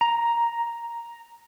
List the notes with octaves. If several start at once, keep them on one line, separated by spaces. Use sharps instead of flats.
A#5